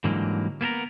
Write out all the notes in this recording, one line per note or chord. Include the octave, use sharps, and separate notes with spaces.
G#2 D3 E3 F#3 G3 A#3
A#3 B3 A4 A#4